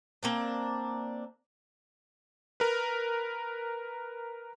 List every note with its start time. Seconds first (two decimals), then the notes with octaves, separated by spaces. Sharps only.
0.23 A#3 C4 D4
2.60 A#4 B4